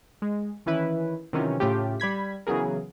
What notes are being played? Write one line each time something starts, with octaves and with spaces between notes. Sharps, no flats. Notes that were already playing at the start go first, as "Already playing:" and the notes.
G#3
D#3 E3 C#4 E4 B4
C3 D#3 E3 F#3 C#4 F4
A2 C#3 A3 F4 G4
G3 B5 G#6 B6
C#3 E3 F#3 B3 G#4 A#4